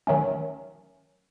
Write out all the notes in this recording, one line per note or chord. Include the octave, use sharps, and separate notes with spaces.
D#3 F#3 A3 C#4